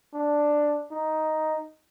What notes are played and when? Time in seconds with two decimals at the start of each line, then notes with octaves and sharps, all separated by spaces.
0.14 D4
0.91 D#4